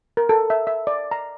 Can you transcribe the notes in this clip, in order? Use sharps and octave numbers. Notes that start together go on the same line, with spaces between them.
A#4
A4
E5
E5
D5
A#5